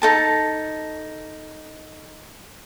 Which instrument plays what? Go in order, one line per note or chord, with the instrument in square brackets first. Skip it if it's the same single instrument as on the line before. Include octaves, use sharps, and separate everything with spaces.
[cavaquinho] D#4 A4 A5